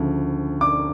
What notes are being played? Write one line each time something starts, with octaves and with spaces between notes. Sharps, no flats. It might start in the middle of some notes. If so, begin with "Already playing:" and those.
Already playing: D2 C#3 F3
D6